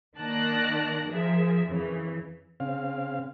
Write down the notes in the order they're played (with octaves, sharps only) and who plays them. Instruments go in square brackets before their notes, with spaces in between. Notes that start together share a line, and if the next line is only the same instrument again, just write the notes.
[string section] D#3 A#3 D5 A5 F#6 A#6
F3 G#4 A#4 E5
F2 C#3 E3
[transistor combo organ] C#3 C4 F5